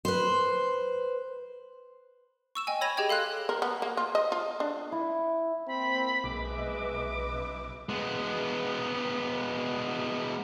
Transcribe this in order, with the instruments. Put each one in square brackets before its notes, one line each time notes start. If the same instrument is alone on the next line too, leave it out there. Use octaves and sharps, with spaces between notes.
[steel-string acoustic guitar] B4 C5
[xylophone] C#6 E6 E7
D#5 G5 G#5
C#5 B5 G#6 A#6 D#7 F7
G4 G#4 D#5 G5 G#6
A4 F5 C6 F#6
[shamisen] A#4
B3
A#3
F4
D#5
F4
D4
[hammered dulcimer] E4
[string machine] A#3 [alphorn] C4 [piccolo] B5
[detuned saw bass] B1 [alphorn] G#3 [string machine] B4 D#5 E5 [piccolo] D6
[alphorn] C#3
[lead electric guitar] G#3 B3